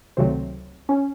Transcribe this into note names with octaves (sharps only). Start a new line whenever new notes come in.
C#2 C3 D#3 F#3 A3 C4
C#4